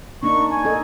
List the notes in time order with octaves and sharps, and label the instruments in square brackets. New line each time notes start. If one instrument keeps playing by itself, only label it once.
[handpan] A#3 D4 D#4 [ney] C#6
[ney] G#5
[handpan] D#4 A4 D#5